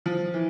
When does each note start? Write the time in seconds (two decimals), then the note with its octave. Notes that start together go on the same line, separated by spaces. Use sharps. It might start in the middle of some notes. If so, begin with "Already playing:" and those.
0.06 F3
0.34 E3